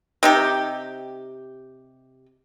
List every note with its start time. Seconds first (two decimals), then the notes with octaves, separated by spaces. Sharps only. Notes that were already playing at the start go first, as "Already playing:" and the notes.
0.23 C3 D#4 G4